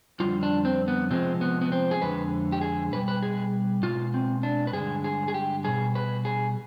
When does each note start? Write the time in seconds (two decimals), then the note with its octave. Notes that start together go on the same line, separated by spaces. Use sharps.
0.20 F2 D3 G3 F4
0.43 D4
0.65 C4
0.88 B3
1.10 C3 F3 G#3 C4
1.41 B3
1.61 B3
1.72 C4
1.91 G#4
2.01 F2 D3 G#3 B4
2.52 G4
2.61 G#4
2.92 B2 G3 B4
3.08 B4
3.23 G#4
3.83 B2 G#3 F4
4.14 C4
4.43 D4
4.67 B4
4.73 G2 D3 G#3 G#4
5.04 G#4
5.28 G#4
5.34 G4
5.64 B2 G3 G#4
5.95 B4
6.25 G#4